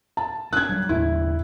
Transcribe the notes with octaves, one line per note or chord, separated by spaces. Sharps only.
A5
C#4 D4 F#6 G#6
F#3 G3
D#2 A2 A3 E4